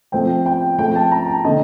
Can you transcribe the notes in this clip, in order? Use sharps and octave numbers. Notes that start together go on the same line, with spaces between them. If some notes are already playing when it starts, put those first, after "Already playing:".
F3 A3 C4 G5
G5
F3 A3 C4 G5
A5
A#5
A5
D3 A3 D#4 D#5